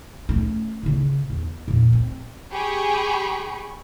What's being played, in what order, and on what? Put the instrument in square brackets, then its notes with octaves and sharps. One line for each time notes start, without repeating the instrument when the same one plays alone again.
[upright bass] A3 C#4
A2 C#3
E2
F2 A#2
C4
[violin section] G4 G#4 B5 C#6